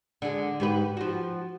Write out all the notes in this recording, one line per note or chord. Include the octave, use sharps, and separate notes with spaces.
D3 G#3
G#2 G4 B4
F3 F#4